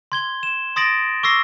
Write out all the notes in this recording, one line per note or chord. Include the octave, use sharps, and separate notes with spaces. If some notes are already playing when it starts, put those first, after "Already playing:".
C6 G#6 G7
E7
C6 D#6 A6 A#6 D7 F#7
C#6 D6 E6 A#6 C7